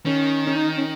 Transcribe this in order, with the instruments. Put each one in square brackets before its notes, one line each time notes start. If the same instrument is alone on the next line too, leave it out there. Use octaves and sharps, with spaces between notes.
[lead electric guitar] D#3 [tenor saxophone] C#4
[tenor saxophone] C#4
D#4
C#4